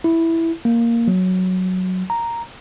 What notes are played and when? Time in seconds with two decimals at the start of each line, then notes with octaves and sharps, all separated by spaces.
0.04 E4
0.65 A#3
1.08 F#3
2.10 A#5